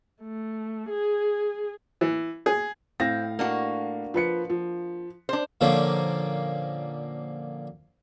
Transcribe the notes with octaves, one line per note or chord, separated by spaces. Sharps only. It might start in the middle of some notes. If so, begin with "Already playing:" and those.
A3
G#4
E3
G#4
A2 C4 F5 A#6
A#3 D4 F#4
F3 B4 C#7
F3
D4 C5
A#2 D3 F3 A#3 C#4 D4